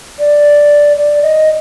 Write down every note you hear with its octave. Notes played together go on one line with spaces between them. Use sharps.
D5
D5
D#5